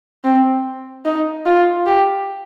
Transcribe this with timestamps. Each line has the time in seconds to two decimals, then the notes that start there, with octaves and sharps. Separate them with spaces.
0.24 C4
1.05 D#4
1.46 F4
1.86 G4